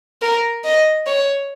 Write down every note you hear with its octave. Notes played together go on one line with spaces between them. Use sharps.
A#4
D#5
C#5